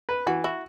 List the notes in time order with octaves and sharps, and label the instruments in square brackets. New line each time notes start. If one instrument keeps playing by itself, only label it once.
[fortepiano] B4
[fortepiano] E3 [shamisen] F#4
[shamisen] E4 [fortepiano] F#4